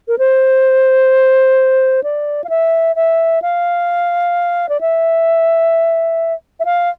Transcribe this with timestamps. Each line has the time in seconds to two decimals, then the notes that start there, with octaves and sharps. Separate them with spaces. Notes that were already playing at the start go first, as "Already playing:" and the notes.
0.08 A#4
0.18 C5
2.03 D5
2.44 F5
2.49 E5
2.96 E5
3.42 F5
4.69 D5
4.81 E5
6.60 E5
6.65 F5